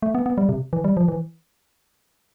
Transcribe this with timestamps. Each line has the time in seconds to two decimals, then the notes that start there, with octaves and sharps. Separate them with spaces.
0.03 A3
0.15 B3
0.26 B3
0.38 G3
0.49 C3
0.73 E3
0.84 G3
0.97 F3
1.08 E3